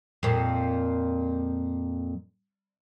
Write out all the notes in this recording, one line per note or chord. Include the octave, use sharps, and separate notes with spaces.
F2 A#2